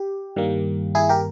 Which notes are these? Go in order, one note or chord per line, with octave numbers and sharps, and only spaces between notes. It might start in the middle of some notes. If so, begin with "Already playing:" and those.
Already playing: G4
G2 D#3 G3 A#3
E4 G#4
G4 A#4